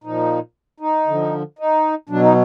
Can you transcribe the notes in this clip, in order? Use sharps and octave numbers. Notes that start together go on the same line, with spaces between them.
A#2 F3 D#4
D#4
D3 F3
D#4
B2 F#3 D4
D#4